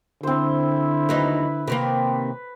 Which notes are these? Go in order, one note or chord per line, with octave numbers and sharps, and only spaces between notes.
D3 C4 E4 C5
D#2 F#3 D#4 B4
C3 D#3 A#3 B4